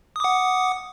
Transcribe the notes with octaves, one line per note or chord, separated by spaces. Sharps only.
F#5 D6 D#6